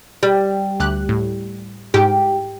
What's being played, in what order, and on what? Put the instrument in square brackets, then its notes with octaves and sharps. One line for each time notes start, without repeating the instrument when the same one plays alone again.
[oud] G3
[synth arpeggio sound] D2 G4 F#6
A2
[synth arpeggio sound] G#2 [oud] G4